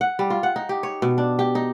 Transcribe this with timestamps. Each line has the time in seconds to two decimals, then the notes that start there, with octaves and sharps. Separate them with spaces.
0.01 F#5
0.19 G3
0.30 F4
0.43 F#5
0.56 D#4
0.69 G4
0.83 C#5
1.02 B2
1.18 D4
1.39 G4
1.55 D#4